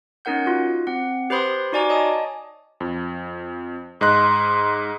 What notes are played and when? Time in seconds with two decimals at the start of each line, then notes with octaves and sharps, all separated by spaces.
0.25 B3 C#4 D#4 A#4 F#5 G6
0.46 D#4 F4 F#4
0.87 C4 F#5
1.30 G4 B4 C5 B5 C6 D#6
1.73 D#4 F#4 D5 G#5 A#5 D6
1.89 C#5 D#5 G#5 A5 D#6
2.80 F2
4.01 G#2 D#5 C6 F#6